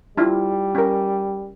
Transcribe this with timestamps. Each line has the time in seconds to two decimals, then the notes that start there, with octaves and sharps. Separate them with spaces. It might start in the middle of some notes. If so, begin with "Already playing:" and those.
0.17 G3 D4 E4 F4
0.75 C#4 A#4